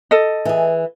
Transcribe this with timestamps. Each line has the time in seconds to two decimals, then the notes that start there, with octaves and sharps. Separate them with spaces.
0.11 A4 D#5
0.45 E3 G#4